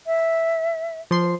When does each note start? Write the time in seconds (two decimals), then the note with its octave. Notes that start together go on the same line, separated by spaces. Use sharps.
0.07 E5
1.11 F3 C6 C7